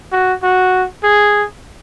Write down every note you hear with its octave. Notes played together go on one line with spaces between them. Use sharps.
F#4
F#4
G#4